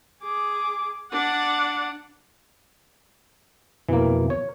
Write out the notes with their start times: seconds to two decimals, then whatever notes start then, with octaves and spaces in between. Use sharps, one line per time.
0.23 G#4 D6
1.12 D4 D5 F#5
3.89 F2 B2 E3 A#3
4.30 C#5